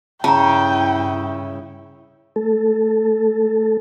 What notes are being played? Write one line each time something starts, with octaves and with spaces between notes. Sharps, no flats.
G2 C#3 E4 G5 A5 A#5
A3 A4